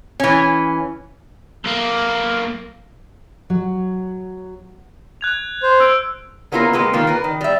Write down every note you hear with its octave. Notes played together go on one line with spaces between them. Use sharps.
E3 C#4
B1 A#3
F#3
F#6 G#6 F7
C5
E6 D7
A#3 B3 C#4 E4 F4 A#4
C3 G#3 A#3 B4
D#3 A#3 F4
A#4 B4
D#3
G3 E5